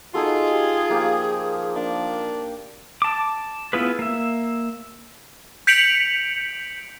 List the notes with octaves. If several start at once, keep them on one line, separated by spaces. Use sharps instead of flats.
D#4 F4 F#4 G#4 A4 C6
G4
F3 A#3 G4 A#4
A#3 D4
A5 D6
B3 E4 F4 G#4 B4
A#3 E5
G6 B6 C#7 D7 F7 F#7